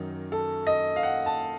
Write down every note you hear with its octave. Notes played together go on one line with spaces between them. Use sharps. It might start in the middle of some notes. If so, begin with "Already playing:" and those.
Already playing: F#2 D#3 F#3 D#4
A4
D#5
F5
F#5
A5